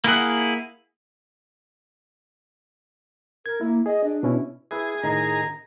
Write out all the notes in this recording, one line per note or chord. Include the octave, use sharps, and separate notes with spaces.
A#3 E4 G#4 F#5
A#4 G#6
A#3 E4
G#4 D#5
D4
B2 C#4 E4
E4 G#4 B4 E5
A2 D#3 D#4 A#5